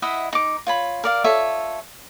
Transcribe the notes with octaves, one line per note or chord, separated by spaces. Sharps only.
E4 D#5 E5 F#5
D#4 D6
F4 C#5 B5
A#4 D5 F5
F4 A4 C#5 E5